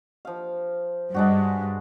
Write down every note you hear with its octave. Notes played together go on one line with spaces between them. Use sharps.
F3 F5
G2 G#3 D4 F#4